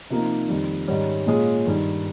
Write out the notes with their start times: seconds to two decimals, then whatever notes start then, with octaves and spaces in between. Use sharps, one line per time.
0.10 C3 F3 A#3 D#4
0.49 F2 D#3 G3
0.88 G#2 D#3 G3 C#4
1.27 A#2 G#3 C#4 F4 G#4
1.66 G2 D#3 G3